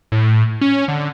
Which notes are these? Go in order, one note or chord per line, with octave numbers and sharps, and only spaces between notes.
A2
C#4
D3